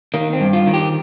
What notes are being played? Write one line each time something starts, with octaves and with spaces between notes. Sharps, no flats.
D#3 A#3
C4
G2
F4
D#3
G4